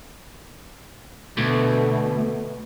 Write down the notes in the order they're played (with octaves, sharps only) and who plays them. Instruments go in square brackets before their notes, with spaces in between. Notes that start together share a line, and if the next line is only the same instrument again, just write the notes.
[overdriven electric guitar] D2 [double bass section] B2 A3